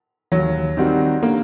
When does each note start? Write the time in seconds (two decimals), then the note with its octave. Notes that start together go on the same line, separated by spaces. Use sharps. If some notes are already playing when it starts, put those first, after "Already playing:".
0.32 D#2 F#3
0.77 D#3 G3 C4 F#4
1.23 D3 A#3